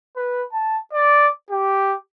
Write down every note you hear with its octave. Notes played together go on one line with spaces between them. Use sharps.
B4
A5
D5
G4